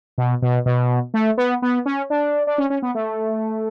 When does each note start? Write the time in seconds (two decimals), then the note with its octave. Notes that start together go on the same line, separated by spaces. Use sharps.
0.18 B2
0.42 B2
0.66 B2
1.14 A3
1.37 B3
1.62 B3
1.86 C#4
2.10 D4
2.47 D4
2.58 C#4
2.70 C#4
2.82 B3
2.95 A3